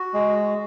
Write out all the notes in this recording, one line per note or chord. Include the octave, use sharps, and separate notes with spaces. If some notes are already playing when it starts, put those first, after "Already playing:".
Already playing: F#4
G#3